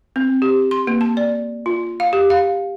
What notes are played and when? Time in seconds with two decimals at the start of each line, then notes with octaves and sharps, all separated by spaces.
0.16 C4
0.42 G4
0.71 C6
0.87 A#3
1.01 A5
1.17 D5
1.66 F4
2.00 F5
2.13 G4
2.30 F5